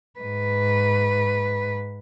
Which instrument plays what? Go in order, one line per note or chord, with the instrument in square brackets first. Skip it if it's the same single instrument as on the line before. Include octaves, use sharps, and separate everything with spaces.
[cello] G#2 B4